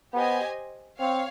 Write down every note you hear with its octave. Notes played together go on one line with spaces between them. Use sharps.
B3 G4 C5 D#5 G#5
C4 C#5 F5